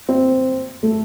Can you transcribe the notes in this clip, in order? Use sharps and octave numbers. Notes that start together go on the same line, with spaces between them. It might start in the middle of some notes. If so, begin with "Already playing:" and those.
C4
A3